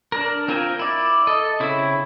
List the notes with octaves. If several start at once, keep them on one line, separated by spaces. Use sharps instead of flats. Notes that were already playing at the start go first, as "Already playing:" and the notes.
D4 A#4
C4 F4 A#4 G5 G#5
E4 D5
A4 D#5
C#3 C4 E4